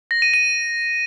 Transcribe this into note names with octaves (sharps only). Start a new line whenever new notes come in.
A#6
D#7
D#7